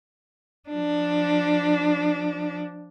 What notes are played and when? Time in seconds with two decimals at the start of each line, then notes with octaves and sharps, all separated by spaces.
0.69 F3 D4